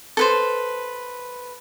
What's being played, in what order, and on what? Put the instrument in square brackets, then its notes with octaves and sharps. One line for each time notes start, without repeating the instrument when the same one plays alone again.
[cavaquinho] A4 B4 C5